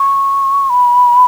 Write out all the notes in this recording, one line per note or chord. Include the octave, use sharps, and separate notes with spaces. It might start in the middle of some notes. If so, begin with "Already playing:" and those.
Already playing: C#6
B5